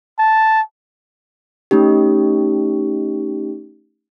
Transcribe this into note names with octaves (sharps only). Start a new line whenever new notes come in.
A5
A3 C#4 D#4 G4